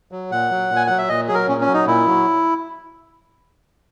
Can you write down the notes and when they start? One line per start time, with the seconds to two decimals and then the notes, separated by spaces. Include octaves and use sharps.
0.12 F#3
0.31 A#2 F#5
0.51 F#3
0.70 A#2
0.76 G#5
0.87 F#3 F#5
0.98 E5
1.09 A#2 D#5
1.28 F#3 G#4
1.35 A#4
1.48 A#2 C#4
1.61 C#4
1.67 F#3
1.74 D#4
1.87 A#2 E4
2.07 F#3